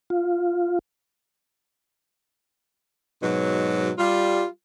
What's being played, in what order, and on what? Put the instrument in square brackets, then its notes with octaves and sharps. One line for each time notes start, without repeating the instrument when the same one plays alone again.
[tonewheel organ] F4
[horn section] G#2 B2 F#3
G3 F4